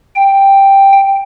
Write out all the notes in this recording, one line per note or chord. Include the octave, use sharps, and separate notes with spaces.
G5